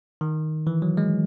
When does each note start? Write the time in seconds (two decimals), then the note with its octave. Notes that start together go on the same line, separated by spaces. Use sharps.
0.21 D#3
0.67 E3
0.82 F#3
0.97 G#3